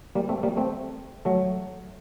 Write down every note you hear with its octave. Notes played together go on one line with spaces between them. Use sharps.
G3 A#3
A3 C4
G3 A#3
A3 C4
F#3 A3